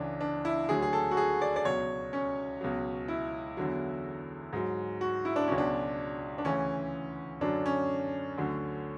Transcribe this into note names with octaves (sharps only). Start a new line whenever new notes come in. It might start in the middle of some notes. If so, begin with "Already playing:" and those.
Already playing: C#2 C#3 E3 D4
D4
E4
D2 D3 F#3 G#4
G#4
A4
F#4
G#4
D5
D5
C#2 B2 F#3 C#5
C#4
C#2 B2 F#3
E4
E2 D3 F#3
G#2 F#3
F#4
E4
D4
C#2 B2 F#3 C#4
D4
D4
D2 C#3 E3 C#4
F#2 D3 F#3 D4
C#4
D2 D3 F#3